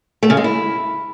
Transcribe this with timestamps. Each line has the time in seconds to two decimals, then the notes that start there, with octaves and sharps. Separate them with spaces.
0.23 A3
0.30 C#3
0.37 G#3
0.44 E4